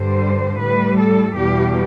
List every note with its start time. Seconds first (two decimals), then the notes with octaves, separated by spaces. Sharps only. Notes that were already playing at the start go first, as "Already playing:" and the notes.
Already playing: G2 D3 G3 C5
0.61 A2 G3 B4
0.99 A4
1.37 E2 B2 G3 G4